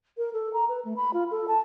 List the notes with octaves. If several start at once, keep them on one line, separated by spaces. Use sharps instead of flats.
A#4
A4
A#5
B4
A3
B5
F4
A4
A5